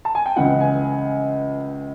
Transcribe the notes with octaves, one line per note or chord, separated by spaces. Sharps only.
A5
G#5
G5
C#2 C#3 E3 F#5
G#5